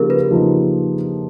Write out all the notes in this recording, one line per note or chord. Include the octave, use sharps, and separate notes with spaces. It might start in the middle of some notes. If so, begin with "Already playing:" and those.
Already playing: C#3 F3 A#3 D#4 G4 G#4 A#4
B4
C#3 F3 A#3 D#4